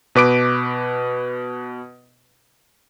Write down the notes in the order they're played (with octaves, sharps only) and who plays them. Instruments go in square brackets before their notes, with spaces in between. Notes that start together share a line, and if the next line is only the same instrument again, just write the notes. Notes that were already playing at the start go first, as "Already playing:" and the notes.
[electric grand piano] B2 B4 D6 D7